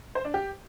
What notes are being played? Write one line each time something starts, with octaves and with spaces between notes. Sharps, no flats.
C5
D4
G4